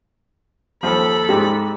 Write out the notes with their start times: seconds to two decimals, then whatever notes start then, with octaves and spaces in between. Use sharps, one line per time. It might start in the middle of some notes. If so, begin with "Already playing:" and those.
0.83 D#2 F3 A4 B5
1.29 G#2 G#3 G4